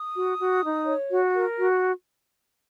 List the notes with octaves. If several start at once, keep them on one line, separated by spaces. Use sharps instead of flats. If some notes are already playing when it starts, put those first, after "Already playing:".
Already playing: D#6
F#4
F#4
D#4
C#5
F#4
A#4
F#4